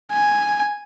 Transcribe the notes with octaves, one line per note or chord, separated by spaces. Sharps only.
G#5